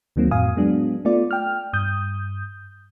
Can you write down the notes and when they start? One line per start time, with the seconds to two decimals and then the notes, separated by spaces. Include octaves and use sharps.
0.16 D2 D#3 F#3 A#3 C4
0.31 F2 A2 F5 G#5 D#6
0.57 F#3 G#3 B3 D4
1.05 A3 B3 F4 D5
1.31 G5 F6
1.73 G2 D#6 G6